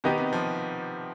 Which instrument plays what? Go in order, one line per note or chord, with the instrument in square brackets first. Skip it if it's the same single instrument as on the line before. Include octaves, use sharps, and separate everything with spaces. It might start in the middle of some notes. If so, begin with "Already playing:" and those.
[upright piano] B2 [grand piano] D#3 B3 D#4 G4
[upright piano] C3
F3